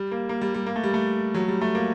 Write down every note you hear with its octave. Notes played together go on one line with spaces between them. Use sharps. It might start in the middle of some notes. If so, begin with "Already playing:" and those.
Already playing: G3
A#3
A#3
G3
G3
A#3
A3
G3
A3
F#3
G3
A3
A#3